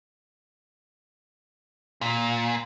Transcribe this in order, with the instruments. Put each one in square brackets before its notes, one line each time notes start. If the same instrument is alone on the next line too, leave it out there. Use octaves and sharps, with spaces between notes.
[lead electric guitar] A#2